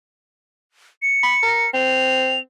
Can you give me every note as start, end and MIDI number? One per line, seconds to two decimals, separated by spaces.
1.02 1.70 97
1.23 1.35 83
1.43 1.66 70
1.74 2.38 60
1.74 2.40 101